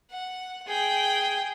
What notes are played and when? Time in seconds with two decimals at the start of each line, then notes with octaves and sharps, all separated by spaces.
0.11 F#5
0.67 G#4 G5